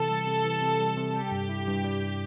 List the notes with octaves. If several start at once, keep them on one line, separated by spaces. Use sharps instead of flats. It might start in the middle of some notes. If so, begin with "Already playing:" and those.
Already playing: C3 E3 A4
G3
C3
E3
C3
G3
C3
G3 G4
G2
E4
G2
G3